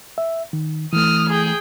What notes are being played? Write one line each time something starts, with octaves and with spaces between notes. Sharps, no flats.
E5
D#3
E3 A3 D#6 F6
G#4 G5